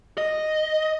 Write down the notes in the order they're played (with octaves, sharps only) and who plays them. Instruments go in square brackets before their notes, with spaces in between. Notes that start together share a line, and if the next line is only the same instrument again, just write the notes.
[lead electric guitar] D#5